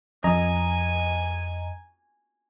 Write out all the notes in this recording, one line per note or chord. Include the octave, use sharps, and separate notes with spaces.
F2 D#5 G#5 A#5